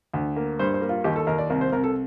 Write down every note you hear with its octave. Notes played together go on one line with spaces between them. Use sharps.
D2
A#3
G2 C5
C5
A#3
F4
D#2 G4
A4
D#2 A#4
D5
C2 A#4
C5
C2 A#4
A4